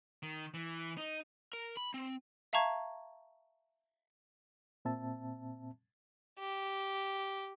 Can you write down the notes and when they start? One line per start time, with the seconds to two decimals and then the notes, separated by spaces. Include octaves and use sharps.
0.23 D#3
0.54 E3
0.97 D#4
1.53 A#4
1.77 B5
1.94 C4
2.53 E5 F5 A5 A#5 C#6 G#6
4.85 A#2 C4 E5 A5
6.39 G4